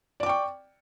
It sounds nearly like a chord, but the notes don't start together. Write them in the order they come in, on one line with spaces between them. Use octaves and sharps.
D5 D6 G5 C#6